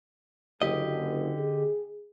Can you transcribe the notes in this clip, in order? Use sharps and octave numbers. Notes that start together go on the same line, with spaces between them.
F#1 D3 G4 D#5
G#4